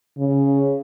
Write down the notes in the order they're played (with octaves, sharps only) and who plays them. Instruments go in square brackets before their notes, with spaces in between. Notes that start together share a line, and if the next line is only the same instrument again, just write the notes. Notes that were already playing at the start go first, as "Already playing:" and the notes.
[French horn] C#3